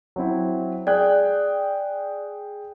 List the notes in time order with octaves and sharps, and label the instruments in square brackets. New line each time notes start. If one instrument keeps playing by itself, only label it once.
[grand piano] F#3 C4 E4
[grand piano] G#4 G5 F#6 [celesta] D5